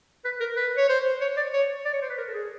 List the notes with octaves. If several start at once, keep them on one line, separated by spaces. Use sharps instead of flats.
B4
A#4
B4
C#5
C5
C#5
D5
C#5
D5
C#5
C5
B4
A#4
A4
G#4